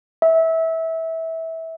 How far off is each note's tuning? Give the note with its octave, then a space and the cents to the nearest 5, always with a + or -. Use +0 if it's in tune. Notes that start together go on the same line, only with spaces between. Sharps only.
E5 -20